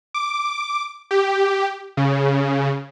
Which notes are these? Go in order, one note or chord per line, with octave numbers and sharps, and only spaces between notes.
D6
G4
C#3